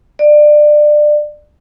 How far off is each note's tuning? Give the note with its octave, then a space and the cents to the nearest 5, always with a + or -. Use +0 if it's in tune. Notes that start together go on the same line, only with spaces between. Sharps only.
D5 +25